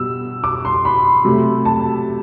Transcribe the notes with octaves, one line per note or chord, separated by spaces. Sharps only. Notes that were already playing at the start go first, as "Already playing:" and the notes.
Already playing: B2 G3 B3 E6
D6
C6
B5
C3 F#3 A3
A5